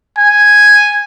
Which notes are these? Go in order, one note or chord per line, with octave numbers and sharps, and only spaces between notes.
G#5